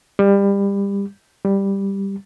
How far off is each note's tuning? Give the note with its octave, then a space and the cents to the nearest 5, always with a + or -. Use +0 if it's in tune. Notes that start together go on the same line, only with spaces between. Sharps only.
G3 +25
G3 +5